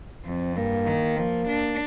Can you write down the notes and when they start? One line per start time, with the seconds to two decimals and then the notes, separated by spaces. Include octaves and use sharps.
0.25 F2 C4
0.56 G2 A#3
0.87 D#3
1.17 F3 A#3
1.48 D4